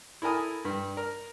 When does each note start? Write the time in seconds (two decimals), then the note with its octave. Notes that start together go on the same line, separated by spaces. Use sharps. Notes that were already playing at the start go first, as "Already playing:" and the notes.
0.22 E4 A4 A#4 G#5 D#6
0.65 G2
0.97 A#4